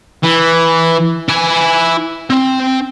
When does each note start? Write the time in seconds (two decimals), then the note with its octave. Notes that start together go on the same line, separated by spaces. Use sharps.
0.23 E3
1.29 E4 G#5
2.30 C4